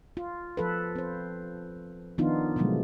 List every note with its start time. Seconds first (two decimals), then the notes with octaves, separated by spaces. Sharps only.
0.17 F4
0.57 F3 A4 B4
0.96 C4 C5
2.18 D#3 F3 B3 D4 D#4 F4
2.56 B2 D3 F3 F#3 G#3 A3